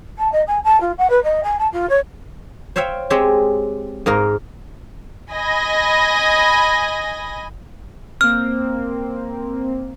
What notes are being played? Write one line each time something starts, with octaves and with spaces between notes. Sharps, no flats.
A5
D#5
G#5
A5
F4
F#5
B4
D#5
G#5
A5
F4
C#5
C5 C#5 E5 F5 G5
G#3 C4 G4 C#5 E5
G#2 A#3 D#4 A#4
D#5 G#5 B5 A#6
A#3 C4 F6